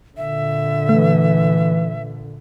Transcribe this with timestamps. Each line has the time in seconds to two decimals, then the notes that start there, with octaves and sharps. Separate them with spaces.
0.17 A#2 D3 E5
0.89 E3 A3